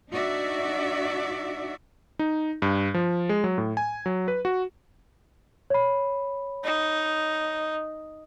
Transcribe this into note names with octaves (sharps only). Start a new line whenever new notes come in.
D4 D#4 F#4 D5 E5
D#4
G2
F3
G#3
F#3
A2
G#5
F#3
B4
F#4
C#5 B5
D#4